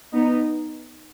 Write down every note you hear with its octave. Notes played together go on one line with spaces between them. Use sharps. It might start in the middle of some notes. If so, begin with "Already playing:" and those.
B3 D#4